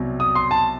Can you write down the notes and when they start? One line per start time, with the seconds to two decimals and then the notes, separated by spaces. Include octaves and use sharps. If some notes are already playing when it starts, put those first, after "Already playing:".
Already playing: C2 B2 F#3 C4
0.20 D#6
0.35 C6
0.51 A5